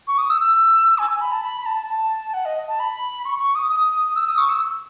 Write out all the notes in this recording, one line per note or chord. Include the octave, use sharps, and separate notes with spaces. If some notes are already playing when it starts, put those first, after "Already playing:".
C#6
D#6
E6
E6
G#5
G#5
B5
A5
B5
B5
A5
A5
F#5
D#5
A5
B5
C#6
C#6
D#6
D#6
E6
D#6
C#6
E6